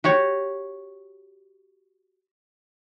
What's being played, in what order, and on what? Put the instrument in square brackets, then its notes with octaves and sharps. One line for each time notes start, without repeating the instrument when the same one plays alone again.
[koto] F#4 G4 C#5